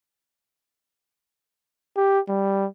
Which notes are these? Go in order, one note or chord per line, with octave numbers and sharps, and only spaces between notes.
G4
G3